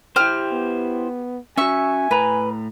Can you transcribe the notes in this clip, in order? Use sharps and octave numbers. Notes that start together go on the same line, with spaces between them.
E4 G4 C5 F6
B3
C#4 F#4 E5 G#5 C#6
A2 B4 A#5